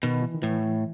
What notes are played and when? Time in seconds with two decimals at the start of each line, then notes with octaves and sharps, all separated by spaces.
0.03 B2 D#3
0.22 E3
0.34 D#3
0.43 A2 E3